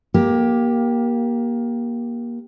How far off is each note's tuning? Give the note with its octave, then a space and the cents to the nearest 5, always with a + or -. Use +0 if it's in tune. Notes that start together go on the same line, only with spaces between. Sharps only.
A#3 +20 G4 +0